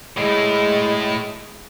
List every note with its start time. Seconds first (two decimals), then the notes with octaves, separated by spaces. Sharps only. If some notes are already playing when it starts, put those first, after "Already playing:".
0.17 A2 G#3 E4